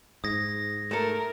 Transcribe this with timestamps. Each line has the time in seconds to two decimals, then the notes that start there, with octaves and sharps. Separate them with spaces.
0.24 G#2 D#6 G#6 A#6
0.91 A3 A4 A#4